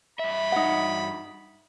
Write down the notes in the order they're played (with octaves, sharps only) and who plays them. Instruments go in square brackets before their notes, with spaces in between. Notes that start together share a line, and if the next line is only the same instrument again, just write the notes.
[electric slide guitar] G2 E5 [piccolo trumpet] B5
[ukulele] D#4 F#5